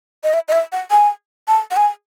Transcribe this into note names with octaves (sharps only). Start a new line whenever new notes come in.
D#5
E5
D#5
E5
F#5
G#5
A5
F#5
G#5